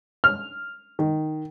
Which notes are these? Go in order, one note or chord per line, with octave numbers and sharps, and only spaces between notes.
F6
D#3